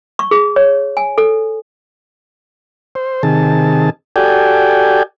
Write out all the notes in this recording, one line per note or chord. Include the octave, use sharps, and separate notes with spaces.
C#6
G#4
C#5
G#5
A4
C5
C3 D#3 G#4 A5
F#4 G4 A4 D5 G5 G#5